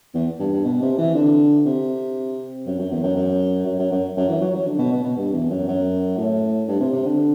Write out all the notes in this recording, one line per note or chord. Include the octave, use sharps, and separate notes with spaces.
E2
G2
G2
B2
C3
E3
D3
C3
F#2
F#2
E2
F#2
F#2
F#2
F#2
F#2
F#2
E3
F#3
F#3
D3
B2
B2
B2
G2
E2
F#2
F#2
A2
G2
C3
C3
D3